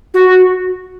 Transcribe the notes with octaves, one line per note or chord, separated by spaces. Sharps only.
F#4